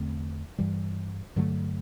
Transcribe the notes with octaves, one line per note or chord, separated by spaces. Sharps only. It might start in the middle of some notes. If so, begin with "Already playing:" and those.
Already playing: E2 D3 A3 C4
G2 E3 G3
G2 D3 F#3 A3